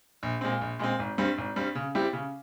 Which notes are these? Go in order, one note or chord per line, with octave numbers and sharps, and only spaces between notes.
A#1
A#2 G#3 C4
A#1
A#2 G#3 C4
G#1
G2 G3 C4
G#1
G2 G3 C4
C#3
G3 C4 E4 G4
C#3